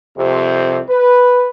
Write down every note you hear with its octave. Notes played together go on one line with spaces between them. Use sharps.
C2 F2 C3
B4